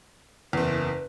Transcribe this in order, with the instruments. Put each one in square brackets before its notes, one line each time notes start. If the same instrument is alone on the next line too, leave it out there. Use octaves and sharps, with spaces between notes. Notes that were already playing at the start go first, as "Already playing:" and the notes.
[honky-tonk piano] F#1 E2 [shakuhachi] B4